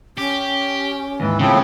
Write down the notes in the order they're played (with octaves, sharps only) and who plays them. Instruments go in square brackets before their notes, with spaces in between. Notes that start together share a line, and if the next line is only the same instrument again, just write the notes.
[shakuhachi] C#4 [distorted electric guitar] G4
[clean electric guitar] D#2 G#2 [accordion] E3
[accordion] A2 F3 C4 [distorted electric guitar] C#3